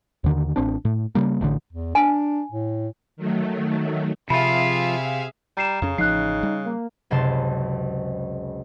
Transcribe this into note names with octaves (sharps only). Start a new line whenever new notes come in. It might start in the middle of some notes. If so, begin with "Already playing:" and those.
D#2 D3 D#3
A1 C4 D4
A2
C#3 G3 A#3
A1 A2 D3
E2
D4 G#5
A2
D#3 F#3 A3
C3 F3 F4 G#4 E5 F5 B5
G3 A#5 C7 E7
F2 C#3 C#4
A1 F3 D#4 F#6 C7
G3
A#3
F#1 C#2 C3 C5 A5